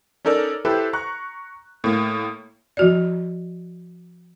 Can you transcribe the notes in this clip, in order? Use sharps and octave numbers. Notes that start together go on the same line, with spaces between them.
C#4 D#4 A4 A#4 D5
E4 G4 A4 B4 C5
A#5 C#6 F#6
A2 A#3
F3 F#4 D5